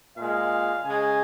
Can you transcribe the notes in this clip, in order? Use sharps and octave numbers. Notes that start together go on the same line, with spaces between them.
A#2 G#3 F5
C#3 G#3 G#5